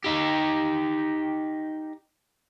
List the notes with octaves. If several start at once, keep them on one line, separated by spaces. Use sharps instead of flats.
D#4 G4